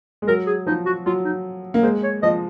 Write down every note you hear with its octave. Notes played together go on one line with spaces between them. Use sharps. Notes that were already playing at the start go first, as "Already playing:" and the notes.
G#3
F#3 A#4
G#4
F3 D#4
F#4
F#3 F4
D#4
A#3
G#3 C5
C#5
F3 D#5